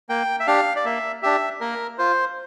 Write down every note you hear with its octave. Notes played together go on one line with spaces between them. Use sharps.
A#3 G5
E5
D4 G4 F5
D5
A#3 E5
D4 G4 E5
A#3 A#4
F4 C5